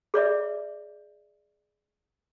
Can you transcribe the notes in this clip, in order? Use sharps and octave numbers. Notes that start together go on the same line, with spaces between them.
G#4 C#5 D5 E5